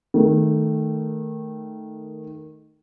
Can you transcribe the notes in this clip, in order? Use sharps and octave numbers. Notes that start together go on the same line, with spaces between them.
D#3 A3